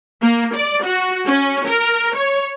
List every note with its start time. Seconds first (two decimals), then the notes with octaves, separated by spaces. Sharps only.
0.21 A#3
0.55 D5
0.84 F#4
1.27 C#4
1.66 A#4
2.16 C#5